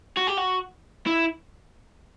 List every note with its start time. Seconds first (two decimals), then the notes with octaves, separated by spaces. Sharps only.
0.17 F#4
0.27 G4
0.37 F#4
1.06 E4